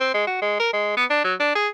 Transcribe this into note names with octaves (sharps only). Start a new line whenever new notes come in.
C4
G#3
F#4
G#3
A#4
G#3
B3
D4
F#3
D4
G#4